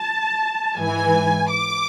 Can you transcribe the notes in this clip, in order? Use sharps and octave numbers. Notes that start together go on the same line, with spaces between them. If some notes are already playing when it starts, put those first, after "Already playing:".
Already playing: A5
G#2 E3 G#5
D6